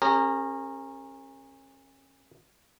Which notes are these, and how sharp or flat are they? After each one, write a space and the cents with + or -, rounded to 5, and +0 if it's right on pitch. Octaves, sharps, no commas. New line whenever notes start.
C#4 -30 G4 +45 A#4 -15